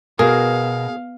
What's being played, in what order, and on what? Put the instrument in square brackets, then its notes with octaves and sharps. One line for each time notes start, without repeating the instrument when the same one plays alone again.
[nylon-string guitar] B2 [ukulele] F#4 A#4 [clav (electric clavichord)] G#4 [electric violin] F5